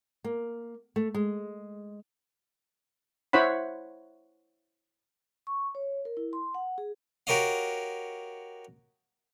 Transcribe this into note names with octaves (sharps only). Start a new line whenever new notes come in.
A#3
A3
G#3
E4 C5 C#5 F#5 B5
C#6
C#5
A#4
E4
C6
F#5
G#4
F#4 G4 A#4 C#5 D#5 F5